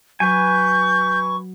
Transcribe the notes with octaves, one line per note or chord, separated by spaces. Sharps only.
F#3 B4 G#5 C#6 G6